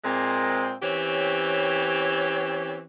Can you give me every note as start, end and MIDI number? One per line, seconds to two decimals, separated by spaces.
0.04 0.76 46
0.04 0.76 56
0.04 0.76 58
0.04 0.76 60
0.82 2.81 52
0.82 2.81 60
0.82 2.81 61
0.82 2.81 67
0.82 2.81 73